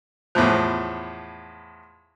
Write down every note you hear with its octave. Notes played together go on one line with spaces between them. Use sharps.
E2 A2 F3